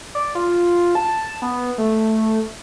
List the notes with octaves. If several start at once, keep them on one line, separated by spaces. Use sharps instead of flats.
D5
F4
A5
B3
A3